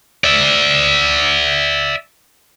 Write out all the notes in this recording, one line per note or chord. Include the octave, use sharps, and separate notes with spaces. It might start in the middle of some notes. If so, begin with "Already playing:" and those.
D5 E5